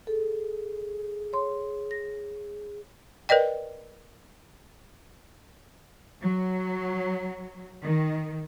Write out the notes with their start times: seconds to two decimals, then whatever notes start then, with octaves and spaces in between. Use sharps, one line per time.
0.07 G#4 A4
1.33 C#5 C6
1.91 A#6
3.29 A#4 B4 D5 D#5 G5
6.22 F#3
7.82 D#3